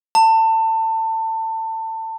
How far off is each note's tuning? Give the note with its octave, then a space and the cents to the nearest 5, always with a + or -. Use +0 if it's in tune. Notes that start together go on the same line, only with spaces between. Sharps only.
A5 +25